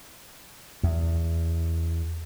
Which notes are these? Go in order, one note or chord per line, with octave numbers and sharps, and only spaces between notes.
E2